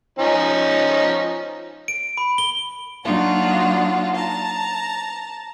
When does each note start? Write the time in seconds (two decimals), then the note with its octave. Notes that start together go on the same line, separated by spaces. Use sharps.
0.19 F3 C#4 D#4
1.88 D7
2.17 B5
2.38 G7
3.05 F#3 A#3 D4 D#4 F4 F#4
4.15 A5 A#5